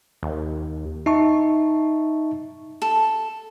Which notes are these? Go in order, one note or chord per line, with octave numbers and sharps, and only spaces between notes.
D#2
D#4 E5 A5 C#6
A4